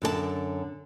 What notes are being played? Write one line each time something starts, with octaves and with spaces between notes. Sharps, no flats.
F#2 D3 F#4 A5